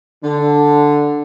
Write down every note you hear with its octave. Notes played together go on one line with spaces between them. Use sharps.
D3